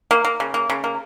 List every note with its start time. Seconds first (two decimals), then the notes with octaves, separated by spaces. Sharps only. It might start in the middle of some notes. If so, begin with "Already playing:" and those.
0.11 A#3
0.25 A#3
0.40 C#3
0.54 A#3
0.70 C#3
0.84 A#3